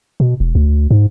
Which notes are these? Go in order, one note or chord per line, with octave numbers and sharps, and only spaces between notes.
B2
E1
D2
G#2